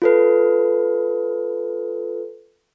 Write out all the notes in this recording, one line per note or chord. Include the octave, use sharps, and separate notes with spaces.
F4 A4 B4